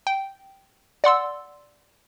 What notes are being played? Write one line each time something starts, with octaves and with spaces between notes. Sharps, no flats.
G5
D5 F#5 C6 E6